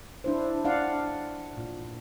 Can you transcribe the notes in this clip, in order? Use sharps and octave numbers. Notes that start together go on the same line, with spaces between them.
D4 E4 C5
D4 D5 F5 F#5
A#2